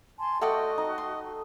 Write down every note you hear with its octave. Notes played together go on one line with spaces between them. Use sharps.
G#5 A5 C6
A3 F#4 D5 D#5 F#5 G5
D#4
C6